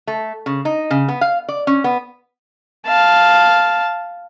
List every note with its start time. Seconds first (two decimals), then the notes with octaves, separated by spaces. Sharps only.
0.07 A3
0.46 C#3
0.65 D#4
0.91 C#3
1.08 B3
1.21 F5
1.48 D5
1.67 C#4
1.84 B3
2.87 F5 A5